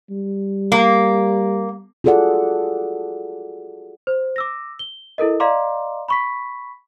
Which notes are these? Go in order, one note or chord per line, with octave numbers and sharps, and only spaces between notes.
G3
A#3
F4 F#4 G#4 A4 D5 F#5
C5
D6 E6 A#6
G7
E4 A4 A#4 D#5
D5 D#5 F5 A#5 C6 D6
B5 C#6 B6